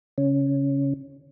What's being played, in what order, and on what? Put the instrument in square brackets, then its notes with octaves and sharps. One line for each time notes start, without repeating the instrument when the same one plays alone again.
[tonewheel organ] C#3 C#4